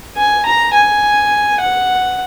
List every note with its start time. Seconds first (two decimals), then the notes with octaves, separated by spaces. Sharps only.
0.17 G#5
0.46 A#5
0.74 G#5
1.61 F#5